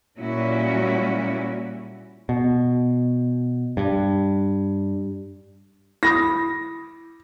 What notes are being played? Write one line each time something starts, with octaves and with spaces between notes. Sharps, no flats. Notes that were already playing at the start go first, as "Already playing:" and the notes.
A#2 F#3 G3 C#4 E4 F#4
B2
G2
E4 B5 D#6 A#6